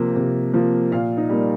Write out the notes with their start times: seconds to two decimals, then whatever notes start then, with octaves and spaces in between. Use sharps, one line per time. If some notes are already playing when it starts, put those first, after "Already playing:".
Already playing: C3 F3 A#3
0.16 C3
0.54 F3 A#3
0.92 A#2 F5
1.17 D#4
1.30 G3 A#3